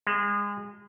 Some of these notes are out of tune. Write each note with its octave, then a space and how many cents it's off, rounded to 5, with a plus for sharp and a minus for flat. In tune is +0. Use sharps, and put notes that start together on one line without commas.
G#3 -30